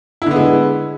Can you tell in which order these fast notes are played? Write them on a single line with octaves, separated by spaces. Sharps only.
E4 D3 B3 G#3